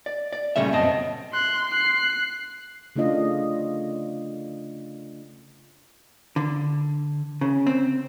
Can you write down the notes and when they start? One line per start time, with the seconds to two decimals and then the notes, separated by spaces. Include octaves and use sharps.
0.06 D5
0.32 D5
0.56 A#2 C#3 G3 A3 E5
0.72 B1 F#2 B3 C4 D#5 A5
1.33 C6 F#6
1.69 F#6 C7
2.96 C#3 A3 D4 F4 D#5
6.36 D3
7.41 C#3
7.67 C4